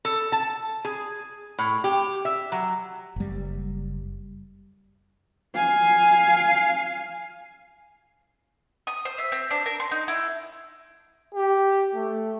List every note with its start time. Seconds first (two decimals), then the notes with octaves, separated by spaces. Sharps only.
0.05 A4
0.32 A5
0.85 G#4
1.59 A2
1.84 G4
2.25 E5
2.52 F#3
3.16 F#1 G3
5.55 F5 G#5
8.87 D#6
9.05 C5
9.18 E5
9.32 C4
9.51 D4
9.66 A#4
9.80 C6
9.91 D#4
10.08 E4
11.34 G4
11.95 A3